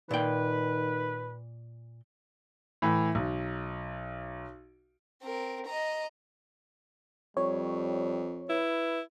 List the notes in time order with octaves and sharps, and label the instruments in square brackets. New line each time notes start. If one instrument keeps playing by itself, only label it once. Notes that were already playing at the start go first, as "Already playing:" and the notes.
[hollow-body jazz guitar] A#2 G5 [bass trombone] D#3 [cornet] B4
[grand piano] A2 E3
B1
[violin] C4 A#4
D#5 A#5
[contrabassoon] F2 [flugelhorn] G3 [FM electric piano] C#5
[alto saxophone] E4 [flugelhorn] B4